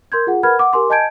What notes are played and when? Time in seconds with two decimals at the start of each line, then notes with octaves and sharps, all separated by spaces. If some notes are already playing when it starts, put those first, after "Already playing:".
0.12 A#4 C6 G6 G#6
0.27 F4 G#4 F#5
0.43 A#4 B4 F#5 B5 F6 G#6
0.59 F#5 D6
0.73 G4 A#4 G#5 C6 D6
0.90 D#5 G#5 A5 G6 G#6 D7